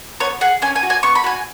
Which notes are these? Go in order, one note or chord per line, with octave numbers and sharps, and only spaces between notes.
B3 C#5
G#4 F#5
C#4 G#5
G#5
F#4
G#5
B3 C#6
B5
F#4 G#5